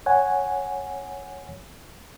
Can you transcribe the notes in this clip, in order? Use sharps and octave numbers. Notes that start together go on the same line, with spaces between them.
C#5 F#5 G#5